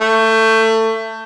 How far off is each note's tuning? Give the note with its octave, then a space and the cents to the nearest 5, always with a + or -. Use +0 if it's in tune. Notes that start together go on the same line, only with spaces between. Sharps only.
A3 +20